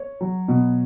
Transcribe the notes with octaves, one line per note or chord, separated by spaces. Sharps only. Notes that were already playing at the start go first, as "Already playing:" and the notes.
Already playing: C#5
F#3
B2